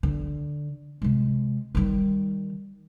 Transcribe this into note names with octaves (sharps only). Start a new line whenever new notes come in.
D3
C3 G#3
D#3 G3